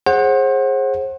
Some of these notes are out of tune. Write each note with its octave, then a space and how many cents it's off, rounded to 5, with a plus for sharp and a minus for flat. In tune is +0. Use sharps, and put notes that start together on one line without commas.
G#4 +0 C5 +35 F#5 +0